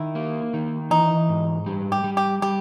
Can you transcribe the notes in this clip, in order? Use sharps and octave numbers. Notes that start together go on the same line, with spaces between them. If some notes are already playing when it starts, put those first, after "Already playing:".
Already playing: D#3 E4
A#3
D#3
E3 D#4
G#2
G3
G4
G3
G4
G3 G4